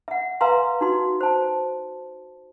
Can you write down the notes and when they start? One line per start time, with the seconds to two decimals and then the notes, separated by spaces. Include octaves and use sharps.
0.08 E5 F#5
0.41 B4 E5 F5 G#5 A#5 C6
0.81 D#4 F#4 C6
1.21 C5 A5